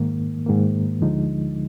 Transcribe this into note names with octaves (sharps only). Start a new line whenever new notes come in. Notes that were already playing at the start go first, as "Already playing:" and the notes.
Already playing: G#2 D#3 A#3
G#2 D#3 A#3
D2 D3 F3 G#3 D#4